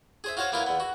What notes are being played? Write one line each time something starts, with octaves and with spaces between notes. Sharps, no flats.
G#4 C5 E5
F4 F#4 C5 C#5 F5
A#3 B3 E4 F4 A#4
E2 B3
F#4